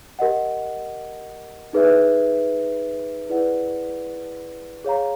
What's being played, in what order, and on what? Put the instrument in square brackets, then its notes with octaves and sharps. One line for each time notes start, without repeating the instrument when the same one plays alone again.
[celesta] G4 A#4 D#5 F#5
D#4 G#4 B4 E5
E4 G#4 B4 D5 F#5
G#4 C#5 F5 A#5